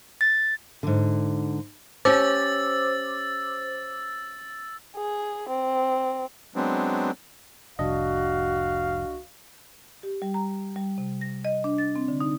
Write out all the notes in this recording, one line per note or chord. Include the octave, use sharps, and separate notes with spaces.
A6
G#2 D3
C#4 G4 C5 D6 E6 A6
G#4
C4
F#3 G#3 B3 C4 D4
F1 C2 D4 F#4 D#5 F5
G4
G3
A#5
G3
C3
A#6
D#5
D4
A6
C4
D3
D#4